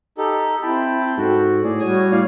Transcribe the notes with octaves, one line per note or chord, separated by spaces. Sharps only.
D#4 G4 A4
C4 E4 G5 A5 B5
G#2 F#4 A4
A2 G#4 D5
G3 F#4 C#5 G#5 D#6
A2 C#5 D5 F5